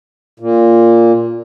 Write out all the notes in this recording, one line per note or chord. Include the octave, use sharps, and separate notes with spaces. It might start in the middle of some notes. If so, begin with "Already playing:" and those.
A#2